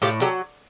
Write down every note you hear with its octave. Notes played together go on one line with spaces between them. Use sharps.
A2 F4 G4
F#3 G4 A4